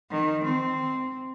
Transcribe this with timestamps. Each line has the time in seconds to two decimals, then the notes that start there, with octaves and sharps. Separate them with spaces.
0.11 D#3
0.44 C4